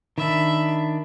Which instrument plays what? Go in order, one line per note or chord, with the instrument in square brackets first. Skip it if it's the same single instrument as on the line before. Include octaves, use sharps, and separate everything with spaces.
[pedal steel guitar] D#3 D4 [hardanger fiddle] E5 B5